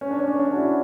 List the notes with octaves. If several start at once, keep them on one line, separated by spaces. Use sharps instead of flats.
C#4
D4
C#4
C#4
D4
F#4
E4